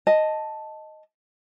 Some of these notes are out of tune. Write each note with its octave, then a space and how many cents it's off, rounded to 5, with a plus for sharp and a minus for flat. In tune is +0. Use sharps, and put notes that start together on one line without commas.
D#5 +0 A5 +0